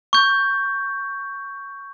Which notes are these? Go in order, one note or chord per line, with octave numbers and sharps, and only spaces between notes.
C#6 G6